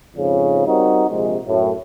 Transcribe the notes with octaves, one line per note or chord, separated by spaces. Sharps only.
F2 G#2 C#3
G3 C4 D#4 F#4 A#4
A#1 C3 G#3
F#2 A2